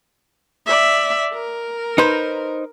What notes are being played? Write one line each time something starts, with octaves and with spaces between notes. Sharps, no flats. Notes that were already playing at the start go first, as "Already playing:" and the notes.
D5 E5
A#4
D#4 B4 C5